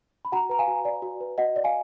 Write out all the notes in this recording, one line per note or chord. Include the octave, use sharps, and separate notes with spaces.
B5
F#4 F#5 A#5
B4 A#5
F5 G#5
F#4
D5
F#4
B4
F#4 D#5 F#5
D5
F5 G#5